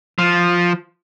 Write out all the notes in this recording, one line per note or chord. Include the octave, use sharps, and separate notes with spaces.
F3